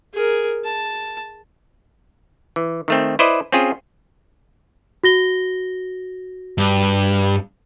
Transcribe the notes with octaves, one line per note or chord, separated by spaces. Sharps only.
G#4 A#4
A5
E3
D#3 A3 C4
E4 B4 C5 D5 D#5
C4 C#4 F4 G#4
F#4 A#6 G7
G2